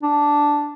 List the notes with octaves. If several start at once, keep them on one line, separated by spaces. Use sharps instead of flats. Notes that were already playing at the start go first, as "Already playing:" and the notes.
D4